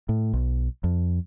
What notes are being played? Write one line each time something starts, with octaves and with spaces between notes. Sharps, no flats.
A2
B1
F2